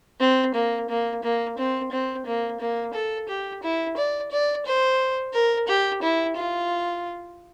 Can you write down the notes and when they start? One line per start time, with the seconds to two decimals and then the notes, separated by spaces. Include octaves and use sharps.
0.20 C4
0.55 A#3
0.89 A#3
1.23 A#3
1.58 C4
1.92 C4
2.26 A#3
2.60 A#3
2.94 A4
3.29 G4
3.63 E4
3.97 D5
4.31 D5
4.66 C5
5.33 A#4
5.68 G4
6.02 E4
6.36 F4